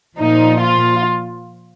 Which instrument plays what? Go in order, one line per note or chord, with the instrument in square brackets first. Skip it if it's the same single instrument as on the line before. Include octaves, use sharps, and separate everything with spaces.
[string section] A#2 F3 D#4
F4